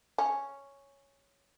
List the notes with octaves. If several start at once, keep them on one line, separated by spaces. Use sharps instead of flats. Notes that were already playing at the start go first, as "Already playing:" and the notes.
C#4